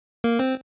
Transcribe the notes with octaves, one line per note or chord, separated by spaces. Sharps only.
A#3
C4